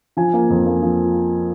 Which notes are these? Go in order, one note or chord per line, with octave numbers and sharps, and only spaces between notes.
F3 G#5
A#3
F2
A#3
F3